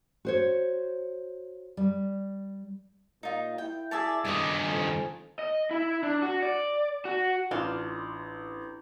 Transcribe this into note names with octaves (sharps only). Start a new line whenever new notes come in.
F#4 C5 C#5
G3
A#2 D#4 F4
E4 G5
G#4 A#4 D5 E5 A5
G2 D#3 D#5 D6
F2
D#5
E4
D4
F#4
D5
F#4
A1 D4 F4